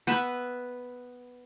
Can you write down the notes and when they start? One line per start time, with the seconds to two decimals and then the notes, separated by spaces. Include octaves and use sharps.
0.07 B3 B4 E5 B5